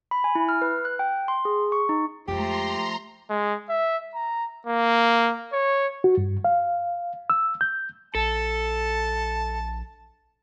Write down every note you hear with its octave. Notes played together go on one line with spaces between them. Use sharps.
B5
G#5
E4
F6
B4
F#6
G5
C6
G#4
C#6
D#4
F2 F3 G#3 A3 G4 A#5 C6
G#3
E5
A#5
A#3
C#5
F#4
G2
F5
E6
G6
A#1 A4 A5